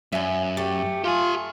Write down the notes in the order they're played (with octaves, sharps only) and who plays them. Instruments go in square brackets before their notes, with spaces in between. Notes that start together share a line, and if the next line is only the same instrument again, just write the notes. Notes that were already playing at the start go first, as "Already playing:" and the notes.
[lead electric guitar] F#2 [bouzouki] E5 G#5
[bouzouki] A3 [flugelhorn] G4
[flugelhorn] F4 [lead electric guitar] G4 G#5